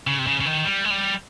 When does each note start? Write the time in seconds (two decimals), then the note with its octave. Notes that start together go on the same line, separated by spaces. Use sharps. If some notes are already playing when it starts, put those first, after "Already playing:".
0.07 C#3
0.19 C3
0.27 C#3
0.40 C#3
0.45 D#3
0.64 G3
0.84 G#3
0.91 G3